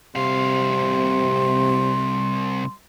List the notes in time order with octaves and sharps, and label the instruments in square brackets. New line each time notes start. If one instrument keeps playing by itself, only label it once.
[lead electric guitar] C2 F5 [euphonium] C3 [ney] C6